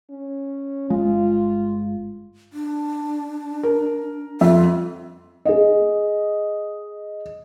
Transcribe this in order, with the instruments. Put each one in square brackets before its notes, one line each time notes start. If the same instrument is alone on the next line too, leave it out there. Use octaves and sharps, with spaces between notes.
[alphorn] C#4
[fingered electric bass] G1 G#3 [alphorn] F4
[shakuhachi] D4
[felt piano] A#4
[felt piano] F2 E5 [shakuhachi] F4
[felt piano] G#4 D#5